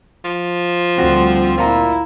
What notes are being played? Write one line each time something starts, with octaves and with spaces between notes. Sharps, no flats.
F3
D2 G3 C4 D4 F#4
A#2 E4 F4 A#5